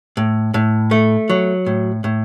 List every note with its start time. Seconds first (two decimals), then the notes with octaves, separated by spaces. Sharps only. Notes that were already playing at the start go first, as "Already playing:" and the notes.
0.17 A2
0.54 A2
0.91 A3
1.30 F#3
1.66 A2
2.04 A2